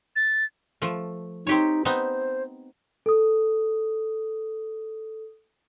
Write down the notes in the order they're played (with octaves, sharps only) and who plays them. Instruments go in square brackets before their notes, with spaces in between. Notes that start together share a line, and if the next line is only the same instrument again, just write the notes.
[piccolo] A6
[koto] F3 A3
[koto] C4 G4 C#5 [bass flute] D#4
[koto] B3 C4 D#4 [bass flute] C5
[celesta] A4 D#6